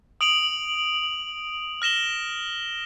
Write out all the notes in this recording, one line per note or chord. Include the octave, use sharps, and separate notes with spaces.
D#6 D7 F7 F#7
F6 A#6 E7 G7